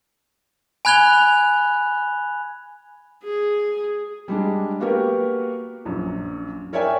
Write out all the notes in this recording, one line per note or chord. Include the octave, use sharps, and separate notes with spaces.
G#5 B5 F#6 G#6 F7 G7
G#4
G3 G#3 D4
A#3 B3 F#4 G4 A#4
A#1 F#2
A#4 C#5 D5 E5 G5 G#5